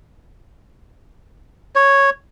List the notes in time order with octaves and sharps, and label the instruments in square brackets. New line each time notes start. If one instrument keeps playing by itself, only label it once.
[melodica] C#5